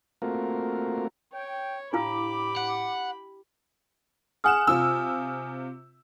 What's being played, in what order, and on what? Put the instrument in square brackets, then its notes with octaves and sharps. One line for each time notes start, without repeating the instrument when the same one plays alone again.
[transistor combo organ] A3 A#3 C4 F4 F#4 A#4
[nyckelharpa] C#5 [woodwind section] G5
[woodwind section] A2 D6 [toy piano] D4 E4 F5 [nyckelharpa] G4 B5
[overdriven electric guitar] F#5
[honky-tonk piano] G#4 F#5 E7 [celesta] G#5 D#6 F6
[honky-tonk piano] C3 F4 E6